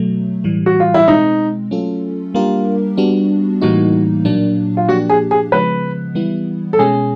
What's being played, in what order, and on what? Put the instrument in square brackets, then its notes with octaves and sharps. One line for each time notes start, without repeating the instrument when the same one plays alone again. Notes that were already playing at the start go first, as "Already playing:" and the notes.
Already playing: [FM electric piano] B2 F#3 A3
A2 E3 G3
[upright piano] F#4
F4
E4
[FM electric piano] B2 G#3 C4 [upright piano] D#4
[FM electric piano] F#3 A3 C#4 F4 A4
[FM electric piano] G3 A#3 D4 G4 A#4 [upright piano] F4
[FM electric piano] G3 B3 D4 F#4
[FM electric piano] A2 E3 G3 A#3 D#4 [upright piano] F#4
[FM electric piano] A#2 F#3 A#3 D4
[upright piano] F4
[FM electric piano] A#2 F3 A#3 D4 G4 [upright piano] F#4
[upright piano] G#4
G#4
[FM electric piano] C#3 F3 G#3 B3 [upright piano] B4
[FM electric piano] E3 G3 B3 E4
[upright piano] A4
[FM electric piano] B2 G#3 C#4 [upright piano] G#4